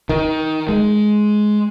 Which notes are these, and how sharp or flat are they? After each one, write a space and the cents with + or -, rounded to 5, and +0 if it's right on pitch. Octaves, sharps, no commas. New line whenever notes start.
D#3 +15
G#3 +15